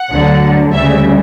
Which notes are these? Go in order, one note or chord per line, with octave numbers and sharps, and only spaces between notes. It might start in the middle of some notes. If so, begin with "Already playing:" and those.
Already playing: F#5
D2 D3 F#3
D2 C#3 G3 E5